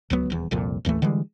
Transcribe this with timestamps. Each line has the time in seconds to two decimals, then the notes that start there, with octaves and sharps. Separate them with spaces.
0.10 D1 C#2 F#3 B3
0.30 D#1 E2
0.51 C2 F2 A#2
0.85 A1 D#2 E3 A3
1.02 D3 E3 G3 G#3